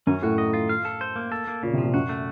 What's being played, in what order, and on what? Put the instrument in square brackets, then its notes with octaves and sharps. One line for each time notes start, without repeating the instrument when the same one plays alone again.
[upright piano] F#2 [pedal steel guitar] C#4
[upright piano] A2 [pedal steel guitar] F#4
[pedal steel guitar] D#5
F4
F5
A4
C5
A#3
A4
A#3
[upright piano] A#2 [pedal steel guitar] C#3
[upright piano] C3
[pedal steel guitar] F3
[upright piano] A#2
[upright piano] F#2 [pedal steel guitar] F#4
[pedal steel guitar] A3